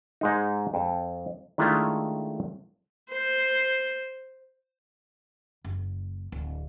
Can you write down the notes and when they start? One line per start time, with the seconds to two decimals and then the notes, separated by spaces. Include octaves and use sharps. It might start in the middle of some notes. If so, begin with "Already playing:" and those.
0.21 G#2 G#3 D#4
0.74 F2 A5
1.58 D#3 G#3 A3 D4 E4 F4
3.10 C5
5.64 F#1
6.32 D1